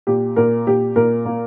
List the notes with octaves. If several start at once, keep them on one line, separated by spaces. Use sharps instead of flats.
A#2 G4
A#2 A#4
A#2 G4
A#2 A#4
A#3